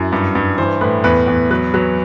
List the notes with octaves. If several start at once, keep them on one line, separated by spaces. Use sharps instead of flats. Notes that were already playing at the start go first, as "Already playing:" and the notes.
Already playing: F#2 E4
G2
G2
E3 C5
A2 B4
E2 B4
E2
F#3 B4
F#3 B4